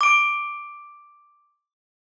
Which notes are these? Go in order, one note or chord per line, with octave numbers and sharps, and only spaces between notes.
D6 D7